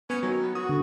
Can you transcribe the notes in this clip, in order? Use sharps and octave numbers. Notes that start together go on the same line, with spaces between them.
B3 C#4
D#3 F#3
B3
F#4 D#6
D3